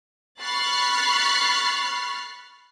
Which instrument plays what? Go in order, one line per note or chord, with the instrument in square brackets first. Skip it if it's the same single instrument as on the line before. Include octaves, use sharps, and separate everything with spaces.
[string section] B5 C#6 F6 F#6 A6 C7